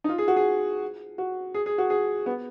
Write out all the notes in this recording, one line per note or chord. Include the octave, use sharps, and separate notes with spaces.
D#4
F4
G#4
F#4
G#4
F#4
G#4
G#4
F#4
G#4
B3